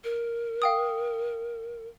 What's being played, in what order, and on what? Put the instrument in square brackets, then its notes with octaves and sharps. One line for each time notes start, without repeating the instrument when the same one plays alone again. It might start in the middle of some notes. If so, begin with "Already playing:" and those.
[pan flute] A#4
[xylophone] F5 G5 D#6